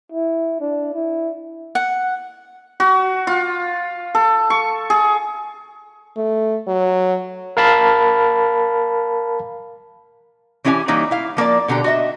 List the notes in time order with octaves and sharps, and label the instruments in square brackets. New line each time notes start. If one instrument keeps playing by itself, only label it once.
[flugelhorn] E4
D4
E4
[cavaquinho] F#5
[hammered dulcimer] F#4
F4
A4
C#6
G#4
[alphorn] A3
F#3
[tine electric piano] A#4 F5 A5 B5
[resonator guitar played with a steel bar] E3 C#4 E4 G4 C#5 G#5
E3 G3 A#3 D#4 E4 C#5
E4 F5
F3 A#3 C5 D5
B2 D3 G4 A#5
F#4 D#5 E5